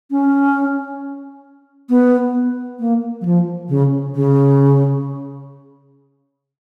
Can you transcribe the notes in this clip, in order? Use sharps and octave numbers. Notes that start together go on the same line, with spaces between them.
C#4
B3
A#3
F#3
F3
C#3
C#3